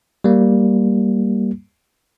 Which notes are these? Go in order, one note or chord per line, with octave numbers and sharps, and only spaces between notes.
G3 A#3